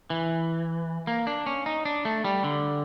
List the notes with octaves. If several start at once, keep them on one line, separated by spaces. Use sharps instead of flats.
E3
A#3
D4
C#4
D#4
D4
A3
G3
D3